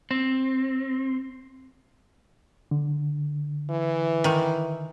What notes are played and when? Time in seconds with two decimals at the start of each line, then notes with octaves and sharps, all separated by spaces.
0.11 C4
2.71 D3
3.70 E3
4.24 D#3